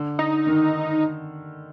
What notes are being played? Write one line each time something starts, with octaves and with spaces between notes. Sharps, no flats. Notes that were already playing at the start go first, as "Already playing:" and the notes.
Already playing: D3
D#4
D#3